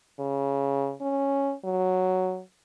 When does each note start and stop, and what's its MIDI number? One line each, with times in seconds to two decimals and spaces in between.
0.19 0.93 49
1.01 1.54 61
1.65 2.42 54